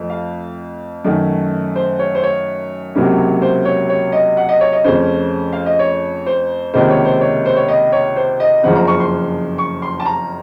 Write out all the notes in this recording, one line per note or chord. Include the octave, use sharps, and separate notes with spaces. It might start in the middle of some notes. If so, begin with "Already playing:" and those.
Already playing: F2 A3
F5
F#2 D#3 A3 C#4
C5
C#5
C5
C#5
C#2 C3 F#3 A#3 C#4
C5
C#5
C#5
D#5
F#5
D#5
C#5
D#5
F2 C#3 A3 C#4 C5
F5
D#5
C#5
C5
C#2 C3 D#3 A#3 D#4 C5
C#5
C5
C#5
C5
C#5
D#5
C#5
C5
D#5
F#1 F2 C#3 F3 C4 F#5
A#5
C#6
C6
C#6
C6
A5
A#5